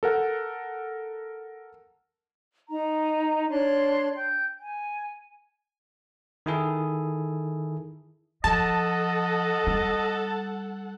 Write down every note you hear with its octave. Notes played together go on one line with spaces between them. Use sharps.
A4 A#4 F#5
D#4 A#5
D4 C#5 C6 F#6
G5 G6
G#5
D#3 E4 G#4 A4
F3 A4 D#5 F#5 A5
G3